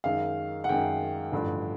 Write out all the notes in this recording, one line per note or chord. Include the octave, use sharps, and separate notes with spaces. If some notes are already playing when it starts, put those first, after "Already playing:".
F#2 D#3 G#3 F5
F#5
F#2 D#3 G#3 G5
A1 G2 D3 F3